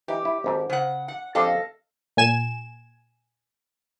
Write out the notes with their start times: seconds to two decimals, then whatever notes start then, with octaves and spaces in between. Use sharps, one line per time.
0.08 E3 D#4 G4
0.25 E4
0.44 G#1 G#2 A4
0.70 C#3 C5 F#5
1.08 F#5
1.35 F2 D4 G4 A4 D#5 F5
2.17 A#2 G#5 E7